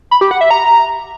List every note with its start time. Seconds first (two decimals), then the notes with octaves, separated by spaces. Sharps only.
0.11 B5
0.21 G4
0.31 F#5
0.41 E5
0.51 A#5